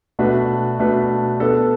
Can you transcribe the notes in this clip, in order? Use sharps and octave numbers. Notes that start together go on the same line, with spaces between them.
B2 A3 D4 F#4 B4
B2 A3 D4 F#4 B4
B3 D4 A4 D5